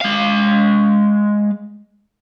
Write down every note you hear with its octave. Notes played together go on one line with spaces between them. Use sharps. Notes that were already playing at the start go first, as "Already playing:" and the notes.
G#3 F5